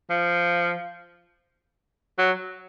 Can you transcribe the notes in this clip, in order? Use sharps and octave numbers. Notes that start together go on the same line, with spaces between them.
F3
F#3